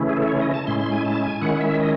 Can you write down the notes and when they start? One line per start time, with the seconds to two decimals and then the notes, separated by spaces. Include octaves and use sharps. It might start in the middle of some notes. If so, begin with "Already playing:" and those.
Already playing: C#3 E3 A3 C#4 E4
0.09 G#4
0.17 A4
0.29 C#5
0.41 D#5
0.54 A5
0.66 A2 G#3 C#4 E4 C6
0.80 C6
0.92 G#5
1.05 A5
1.24 G#5
1.41 D#3 G#3 C#4 E4 F#5
1.61 E5
1.80 D#5